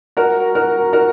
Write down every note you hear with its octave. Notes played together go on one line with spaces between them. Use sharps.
F#4 A#4
F#4 A#4
F#4 A#4